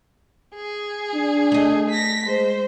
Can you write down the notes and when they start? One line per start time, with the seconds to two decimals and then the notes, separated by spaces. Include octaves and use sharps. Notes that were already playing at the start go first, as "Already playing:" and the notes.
0.55 G#4
1.15 D4
1.52 A3 D#5
1.90 A#6 B6
2.26 G#3 C5